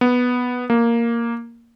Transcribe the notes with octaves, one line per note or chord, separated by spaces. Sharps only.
B3
A#3